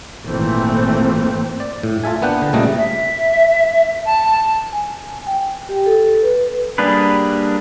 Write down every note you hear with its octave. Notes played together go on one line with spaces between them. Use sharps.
G#1 A#2 E3 A3 A#3 C4
D5
A2
F4 A4 E5 G#5
A#3 B3 D4 F#5 G5
D3
A#2 C#3 G3 A3 A#4 D#5
E5
A5
G#5
G5
G4
A4
B4
G3 A#3 D4 G#4 B4